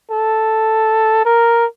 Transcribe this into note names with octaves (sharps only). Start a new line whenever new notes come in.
A4
A#4